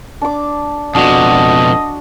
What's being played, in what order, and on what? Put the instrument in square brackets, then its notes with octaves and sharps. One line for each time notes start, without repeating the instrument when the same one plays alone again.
[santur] D4 D6
[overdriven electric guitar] F2 B2 [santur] D4 F#4 [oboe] D#5